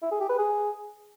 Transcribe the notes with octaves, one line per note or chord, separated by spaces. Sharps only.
E4
G#4
G4
B4
G#4